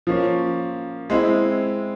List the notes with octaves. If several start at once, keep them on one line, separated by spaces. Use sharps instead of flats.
F3 A#3 C#4
G#3 C4 E4